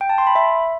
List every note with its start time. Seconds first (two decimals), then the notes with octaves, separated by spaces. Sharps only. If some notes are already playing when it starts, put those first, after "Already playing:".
0.01 G5
0.10 A5
0.18 C6
0.27 B5
0.35 E5